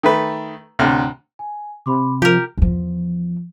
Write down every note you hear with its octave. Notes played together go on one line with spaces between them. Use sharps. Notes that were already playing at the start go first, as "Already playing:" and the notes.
D#3 A3 B4
D2 A2 C3 F6
G#5
C3 B5 C6 D6
F3 F4 G4 A#4
E2 F3